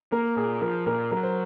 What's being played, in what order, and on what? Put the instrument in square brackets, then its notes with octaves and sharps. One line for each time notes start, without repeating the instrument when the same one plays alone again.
[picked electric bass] A#3 [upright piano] A#4
[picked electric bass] A#2 [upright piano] G#4
[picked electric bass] F3 [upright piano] A#4
[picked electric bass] A#2 [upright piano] A#4
[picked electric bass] F#3 [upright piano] A#4
[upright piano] C5